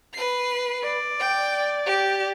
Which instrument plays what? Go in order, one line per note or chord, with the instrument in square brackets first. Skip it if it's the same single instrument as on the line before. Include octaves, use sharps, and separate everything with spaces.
[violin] B4 C7
[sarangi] D5
[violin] G5
G4